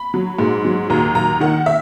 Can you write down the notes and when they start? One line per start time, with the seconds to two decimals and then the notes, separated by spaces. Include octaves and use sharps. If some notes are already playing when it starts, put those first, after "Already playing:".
Already playing: B5
0.14 F#3
0.39 G#2
0.65 F#3
0.90 D#2 A#5
1.15 D#2 A#5
1.40 D#3 F#5
1.66 E5